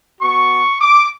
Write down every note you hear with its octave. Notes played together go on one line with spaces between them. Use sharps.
B3 F#4 C#6
D6